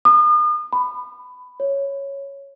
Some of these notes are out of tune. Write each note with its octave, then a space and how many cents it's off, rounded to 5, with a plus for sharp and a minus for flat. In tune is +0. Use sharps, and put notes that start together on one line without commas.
D#6 -40
B5 +15
C#5 -5